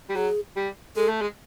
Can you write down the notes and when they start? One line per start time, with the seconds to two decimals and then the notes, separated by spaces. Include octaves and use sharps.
0.09 G3
0.16 F#3 G#4
0.56 G3
0.96 G#3 A4
1.09 A3
1.22 G#3